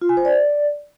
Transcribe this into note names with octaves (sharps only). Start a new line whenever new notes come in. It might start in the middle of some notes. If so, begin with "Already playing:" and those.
F4
G#5
C5
D5